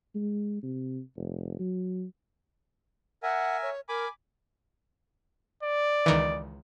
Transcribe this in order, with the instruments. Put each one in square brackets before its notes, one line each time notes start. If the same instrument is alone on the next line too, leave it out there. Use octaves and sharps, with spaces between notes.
[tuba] G#3
C3
F1
F#3
[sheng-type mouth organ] A#4 E5 G#5 [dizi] F#5
[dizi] C#5
[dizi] A#4 [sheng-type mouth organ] G#5 B5 D6
[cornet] D5
[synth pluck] C#2 D#3 E3